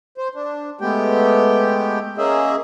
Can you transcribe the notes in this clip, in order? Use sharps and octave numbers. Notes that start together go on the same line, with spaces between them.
C5
D4
G#3 A3 B3 G4 G5
A#3 C#4 G#4 D#5 E5